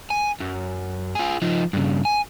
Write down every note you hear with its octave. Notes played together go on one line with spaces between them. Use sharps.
G#5
F#2
F4 G#4
F3 D#4
G2 C#3
G#5